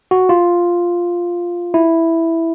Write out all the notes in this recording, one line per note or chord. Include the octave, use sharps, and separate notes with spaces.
F#4
F4
E4